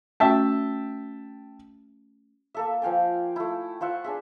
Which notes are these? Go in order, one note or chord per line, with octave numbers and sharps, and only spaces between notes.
A3 C#4 F#4 E5 G5 A5
A#3 A4 E5
F3 F5 G5 G#5
A3 E4
F4 C5 E5 F#5
D4 G#4 E5